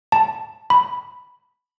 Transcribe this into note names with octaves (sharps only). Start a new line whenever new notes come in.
A5
B5